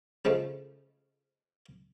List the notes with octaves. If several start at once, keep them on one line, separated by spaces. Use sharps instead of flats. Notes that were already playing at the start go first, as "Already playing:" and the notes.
C#3 F3 G#3 A3